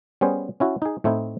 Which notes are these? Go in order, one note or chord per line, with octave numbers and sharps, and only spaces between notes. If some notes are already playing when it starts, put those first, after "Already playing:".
G3 B3 C#4 G#4 C5
C#4 E4 F#4
D#4 G#4
A2 A3 C4 D#4 E4